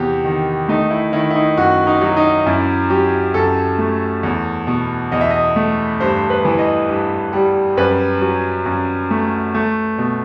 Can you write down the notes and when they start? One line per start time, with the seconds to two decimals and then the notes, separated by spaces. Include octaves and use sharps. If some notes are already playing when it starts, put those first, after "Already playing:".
Already playing: E2 C3 G4
0.24 D#3
0.68 A3 D#4
0.91 E4
1.12 D#3 E4
1.30 E4
1.35 D#4
1.57 F#2 F#4
1.87 D#4
2.01 F#3
2.17 D#4
2.46 F#2 E4
2.90 F#3 G4
3.34 F#2 A4
3.78 A3
4.23 E2
4.67 B2
5.12 E2 D#5
5.21 E5
5.30 D#5
5.56 A3
6.00 G2 C5
6.30 B4
6.45 E3
6.59 D#5
6.89 G2
7.33 G3
7.77 F#2 B4
8.21 F#3
8.66 F#2
9.11 A3
9.54 A3
9.98 B2